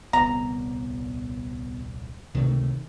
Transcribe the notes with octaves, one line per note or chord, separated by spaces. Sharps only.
D#1 C2 B3 A#5
C#2 A2 C3 D#3 A3